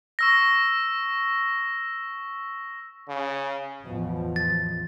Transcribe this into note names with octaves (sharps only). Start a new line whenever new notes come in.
C#6 E6 A#6
C#3
A1 E2 B2 F3
A6